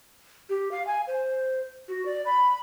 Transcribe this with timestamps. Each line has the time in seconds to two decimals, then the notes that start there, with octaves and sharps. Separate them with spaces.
0.49 G4
0.72 F5
0.87 G#5
1.07 C5
1.88 F#4
2.06 D5
2.26 B5